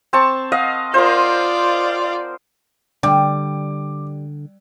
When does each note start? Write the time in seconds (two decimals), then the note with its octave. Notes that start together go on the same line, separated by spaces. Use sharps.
0.13 C4 A5 C#6
0.52 D#5 F5 F#5
0.94 F4 A#4 C5 D5
3.03 D3 G3 D6